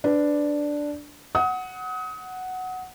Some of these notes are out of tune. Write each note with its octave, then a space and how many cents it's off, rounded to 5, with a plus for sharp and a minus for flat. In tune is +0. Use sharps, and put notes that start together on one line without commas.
D4 +0 B4 +20
F#5 +0 D#6 +30